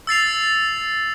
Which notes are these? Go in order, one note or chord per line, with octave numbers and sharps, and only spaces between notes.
E6 A6 C7 F7